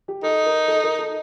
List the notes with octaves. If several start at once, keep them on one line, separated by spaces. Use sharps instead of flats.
G4
D#4 A4
A#4
A4
A#4
A4